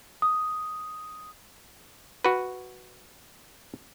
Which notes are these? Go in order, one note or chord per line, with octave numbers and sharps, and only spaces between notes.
D#6
F#4 B4